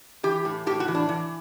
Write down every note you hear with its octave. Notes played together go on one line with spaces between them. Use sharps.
E3 G4
A2
A2 G4
F#4
E3
D4
E3